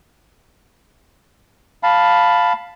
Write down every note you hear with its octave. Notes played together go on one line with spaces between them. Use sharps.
F5 A5 B5